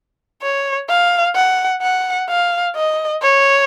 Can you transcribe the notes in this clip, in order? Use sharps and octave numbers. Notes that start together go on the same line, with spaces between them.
C#5
F5
F#5
F#5
F5
D#5
C#5